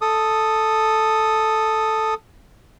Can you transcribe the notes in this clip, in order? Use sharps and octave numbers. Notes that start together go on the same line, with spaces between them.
A4 D#6